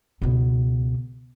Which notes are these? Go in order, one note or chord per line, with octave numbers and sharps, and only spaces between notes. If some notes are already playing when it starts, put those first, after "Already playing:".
C#2 B2